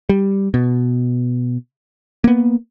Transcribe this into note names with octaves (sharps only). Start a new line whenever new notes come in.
G3
B2
A#3 B3